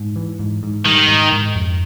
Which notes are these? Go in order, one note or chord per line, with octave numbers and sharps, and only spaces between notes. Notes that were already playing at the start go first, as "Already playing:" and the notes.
Already playing: G#2
E3
G#2
G#2
D#3 G3
G#2
G#2
F2